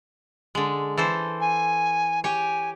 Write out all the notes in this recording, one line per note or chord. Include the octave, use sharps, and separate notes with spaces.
D3 G#3
E3 A4 C5
G#5
G4 C#5 G#5